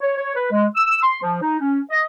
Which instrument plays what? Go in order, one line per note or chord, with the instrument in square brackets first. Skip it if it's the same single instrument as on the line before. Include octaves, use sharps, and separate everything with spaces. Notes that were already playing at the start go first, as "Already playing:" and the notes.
[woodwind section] C#5
C#5
B4
G#3
E6
C6
F3
D#4
C#4
D#5